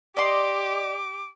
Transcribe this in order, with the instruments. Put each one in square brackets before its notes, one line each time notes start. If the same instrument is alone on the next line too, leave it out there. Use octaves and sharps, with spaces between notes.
[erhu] G4 [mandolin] D5 D#5 C6 [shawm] D6